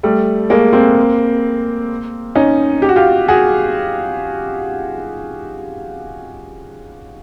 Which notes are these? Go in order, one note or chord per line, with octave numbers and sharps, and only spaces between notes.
G3 A3
G#3 A#3
A#3 C4
C#4 D#4
G4
F#4
F4 G4
F#4 G#4